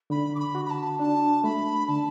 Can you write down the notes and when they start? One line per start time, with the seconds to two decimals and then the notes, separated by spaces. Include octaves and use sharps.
0.10 D3 B5
0.35 D6
0.39 B5
0.55 F#4
0.65 B5
0.70 A5
1.00 D4 A5
1.44 A3 B5
1.88 D3 A5